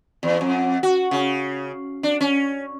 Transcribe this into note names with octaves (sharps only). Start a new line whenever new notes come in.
E2
F2
F#4
C#3
D4
C#4